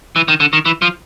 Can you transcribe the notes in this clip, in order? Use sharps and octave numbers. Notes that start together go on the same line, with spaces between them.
E3
D#3
D3
D#3
E3
F3